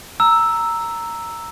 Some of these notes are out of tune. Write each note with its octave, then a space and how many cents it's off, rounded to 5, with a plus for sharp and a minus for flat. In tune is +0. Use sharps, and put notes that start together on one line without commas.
A#5 -10 E6 +0